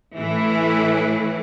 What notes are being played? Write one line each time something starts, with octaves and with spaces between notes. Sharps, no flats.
A2 E3 A3 E4